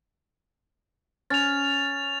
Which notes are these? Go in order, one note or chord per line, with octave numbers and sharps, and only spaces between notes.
C#4 A6 F7